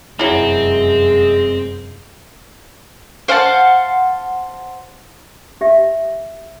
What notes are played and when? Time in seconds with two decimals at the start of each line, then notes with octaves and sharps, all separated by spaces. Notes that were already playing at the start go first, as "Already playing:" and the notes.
0.19 F1 F#2 E3 F#3 G#3 C4
3.28 C5 F5 F#5 A5
5.61 G4 E5